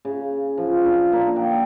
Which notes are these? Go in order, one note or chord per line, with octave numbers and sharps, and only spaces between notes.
C#3
F3
D4
A#3 D4
F#5 G5